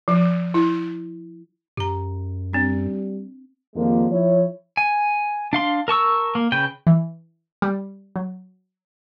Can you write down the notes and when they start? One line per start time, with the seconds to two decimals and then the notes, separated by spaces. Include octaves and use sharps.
0.08 F3
0.54 E4
1.77 F#2 G4 A#5
2.53 G3 C4 D4
3.76 F2 D#3 F3 G3 G#3 A#3
4.11 F3 E4 C#5
4.77 G#5
5.53 D4 F5 C6
5.88 A#4 A5 C#6 E6
6.35 A#3
6.52 C#3 B4 G5
6.87 E3
7.62 G3
8.16 F#3